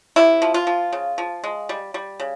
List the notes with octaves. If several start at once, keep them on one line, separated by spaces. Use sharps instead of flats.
C3 E4
F3
F4
F3
C#3
F3
G#3
G3
G3
C#3